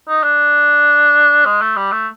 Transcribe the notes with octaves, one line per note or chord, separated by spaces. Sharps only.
D#4
D4
G#3
A3
G3
A3